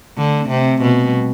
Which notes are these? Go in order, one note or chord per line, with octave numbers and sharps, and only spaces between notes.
D3 A3
C4
C3
C4
B2 B3
G3